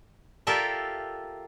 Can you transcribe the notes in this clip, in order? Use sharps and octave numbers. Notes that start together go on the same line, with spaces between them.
F4 G4 A4 A#4 D5 E5